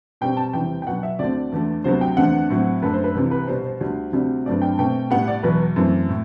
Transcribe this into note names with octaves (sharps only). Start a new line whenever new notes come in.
B2 G3 C4 G5
A5
E2 C3 E3 G3 C4 G5
G5
B2 F#3 B3 F#5
E5
D2 D3 A3 C4 D5
E2 D3 A3
D2 C3 F#3 B3 C5
G5
E2 D3 A3 C4 F#5
A2 F#3 C4
F#2 D3 A3 B4
C5
B4
C2 C3 E3
B4
B2 G3 B3 C5
C5
D2 D3 G3
D2 C3 G3 C4
G2 F#3 A3 C4 D5
G5
B2 A3 C4 G5
A2 G3 B3 F#5
D5
E2 B2 F#3 B4
F#2 E3 A3 C4
A2